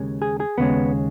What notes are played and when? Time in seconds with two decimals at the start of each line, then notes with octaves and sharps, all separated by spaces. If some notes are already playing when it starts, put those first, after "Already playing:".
Already playing: D#2 C#3 G#3
0.22 G#4
0.40 G#4
0.58 D#2 C#3 G#3 B3